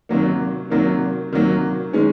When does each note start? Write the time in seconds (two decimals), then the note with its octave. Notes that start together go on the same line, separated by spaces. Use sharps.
0.09 C3 D#3 F#3 A#3
0.70 C3 D#3 F#3 A#3
1.32 C3 D#3 F#3 A#3
1.93 D#3 G#3 C#4